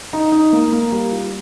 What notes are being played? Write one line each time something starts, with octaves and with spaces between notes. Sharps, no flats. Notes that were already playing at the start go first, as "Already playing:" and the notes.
D#4
D#4
A#3
A#3
G3
F4